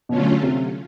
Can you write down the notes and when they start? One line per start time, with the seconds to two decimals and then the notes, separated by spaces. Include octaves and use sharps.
0.09 B2 D3 F#3 A3 C#4 F4
0.43 C3